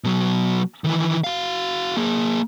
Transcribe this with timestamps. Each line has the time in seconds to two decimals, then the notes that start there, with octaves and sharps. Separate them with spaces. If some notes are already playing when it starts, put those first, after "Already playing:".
0.04 B2 F#3
0.84 D#3 E3
1.24 F#4 F5
1.97 A#3 G#4